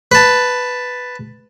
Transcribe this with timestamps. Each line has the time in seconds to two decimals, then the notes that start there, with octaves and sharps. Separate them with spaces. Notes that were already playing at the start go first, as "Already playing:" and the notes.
0.12 B4 A5